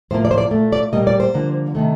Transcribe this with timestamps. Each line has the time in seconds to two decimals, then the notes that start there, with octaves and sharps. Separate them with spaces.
0.11 A2 F3 A#3 C5
0.25 D5
0.31 C5
0.38 D5
0.51 A#2 A3
0.73 D5
0.93 A#2 G3 A#3 D#5
1.07 D5
1.20 C5
1.34 D3 F3 A#3
1.75 C3 D#3 A3